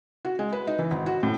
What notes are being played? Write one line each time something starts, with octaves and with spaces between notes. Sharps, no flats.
F#4
G#3
B4
D#4
E3
G#1
F#4
A2